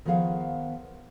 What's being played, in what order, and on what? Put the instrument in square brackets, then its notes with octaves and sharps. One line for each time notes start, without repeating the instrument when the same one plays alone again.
[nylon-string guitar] D#3 F3 B3 G#4 F5 F#5